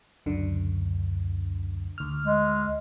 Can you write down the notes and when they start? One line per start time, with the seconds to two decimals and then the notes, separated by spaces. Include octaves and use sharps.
0.26 C#2 F#2 D3
1.98 D2 F6
2.25 G#3